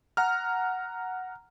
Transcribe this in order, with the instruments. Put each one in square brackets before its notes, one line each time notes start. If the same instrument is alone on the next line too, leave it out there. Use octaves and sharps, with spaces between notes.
[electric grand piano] F#5 A#5 F6